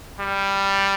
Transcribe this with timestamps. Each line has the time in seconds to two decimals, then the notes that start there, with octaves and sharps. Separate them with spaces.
0.20 G3